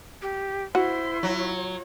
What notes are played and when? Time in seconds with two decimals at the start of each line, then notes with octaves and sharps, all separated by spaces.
0.22 G4
0.75 E4 F#4 C5 C6
1.23 F#3 F4 C#5